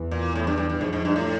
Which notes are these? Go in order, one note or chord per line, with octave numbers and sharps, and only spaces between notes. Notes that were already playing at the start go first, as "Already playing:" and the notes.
Already playing: E2 E3
A#2
A2
G2
G2
G2
F2 G#2 F3
G#2
G2
A2